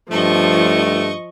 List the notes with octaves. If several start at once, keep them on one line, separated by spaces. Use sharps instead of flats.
G2 F3 A3 D#5 C#6